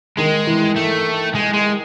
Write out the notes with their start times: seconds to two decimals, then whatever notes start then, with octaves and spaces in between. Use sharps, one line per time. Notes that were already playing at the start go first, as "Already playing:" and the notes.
0.18 D#3 G#3
0.47 E3
0.76 A3
1.35 G#3
1.54 G#3